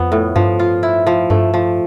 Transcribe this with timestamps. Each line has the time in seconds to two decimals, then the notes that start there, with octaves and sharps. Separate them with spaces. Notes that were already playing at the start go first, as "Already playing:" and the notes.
Already playing: F2 F3 B3
0.12 A2
0.36 G2 F3
0.59 F4
0.83 E4
1.07 F3
1.30 G2 A3
1.54 F3